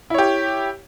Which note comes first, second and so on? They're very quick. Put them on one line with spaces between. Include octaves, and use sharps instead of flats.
E4 C#5 G4